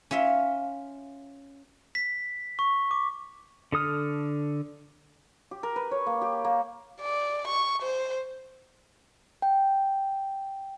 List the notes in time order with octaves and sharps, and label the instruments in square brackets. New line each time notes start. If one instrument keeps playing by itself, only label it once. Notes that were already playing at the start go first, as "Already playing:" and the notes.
[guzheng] C#4 F4 E5 F5
[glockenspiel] B6
C#6
D6
[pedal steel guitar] D3 A4 D#6 F6
[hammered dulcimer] G4
A#4
B4
C#5
A#3
G4
A#3
[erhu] D5
C#6
C5
[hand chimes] G5